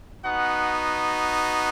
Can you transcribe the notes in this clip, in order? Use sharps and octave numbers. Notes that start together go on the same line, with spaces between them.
B3 D#4 F#4 F#5